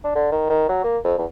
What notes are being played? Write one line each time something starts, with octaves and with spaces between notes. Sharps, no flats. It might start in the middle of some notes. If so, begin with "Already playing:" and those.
D4
D3
D#3
D#3
F#3
A#3
F2
E2